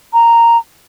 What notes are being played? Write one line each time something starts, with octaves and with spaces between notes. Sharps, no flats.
A#5